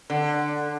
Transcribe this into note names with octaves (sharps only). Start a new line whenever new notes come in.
D3